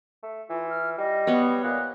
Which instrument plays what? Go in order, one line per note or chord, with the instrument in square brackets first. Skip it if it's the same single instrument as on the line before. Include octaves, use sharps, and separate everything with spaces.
[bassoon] A3
[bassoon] E3 [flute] F4
[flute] F6
[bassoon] G3 [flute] D#5
[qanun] B3 C#5
[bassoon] A#2 [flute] F#6